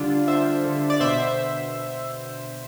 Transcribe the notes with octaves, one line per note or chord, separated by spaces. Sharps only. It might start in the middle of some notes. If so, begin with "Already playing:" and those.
Already playing: D3 G3 D4 F4
D3 C5 E5
D3
D5
B2 C5 E5